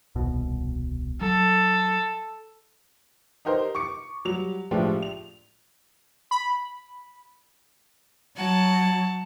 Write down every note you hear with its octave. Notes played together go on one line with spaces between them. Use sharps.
D#1 C2 B2
F#3 A4
D#4 G4 A#4 C5
C#6 D6 C#7
F#3 G3 F7
A2 F3 G#3 D4 F4 G4
F7
B5
F#3 F#5 A5